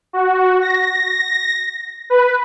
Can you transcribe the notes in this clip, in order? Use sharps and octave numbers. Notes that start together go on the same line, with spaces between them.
F#4
A#6
B4